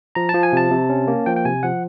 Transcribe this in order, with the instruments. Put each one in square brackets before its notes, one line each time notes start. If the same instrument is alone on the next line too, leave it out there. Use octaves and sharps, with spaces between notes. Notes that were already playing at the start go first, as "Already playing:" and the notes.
[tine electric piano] F3 A#5
A5
F3
G#5
C3 A5
C3
C#4
A#3
F3 G5
G5
C3 G#5
F3 F#5